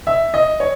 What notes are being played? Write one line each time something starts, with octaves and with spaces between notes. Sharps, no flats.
E5
D#5
C#5